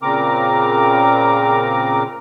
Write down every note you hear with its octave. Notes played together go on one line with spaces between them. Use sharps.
A#2 C#3 C4 A#4 A#5 D6